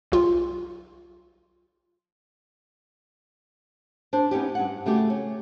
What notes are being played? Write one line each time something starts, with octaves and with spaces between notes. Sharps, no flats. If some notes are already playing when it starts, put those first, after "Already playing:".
B1 F4
D4 C5
B3 C#4 D#4 G4
G2 F#5
C#3 A3 F#4 G4
C#4